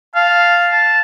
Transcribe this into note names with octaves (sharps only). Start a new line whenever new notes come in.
F5 A5
A5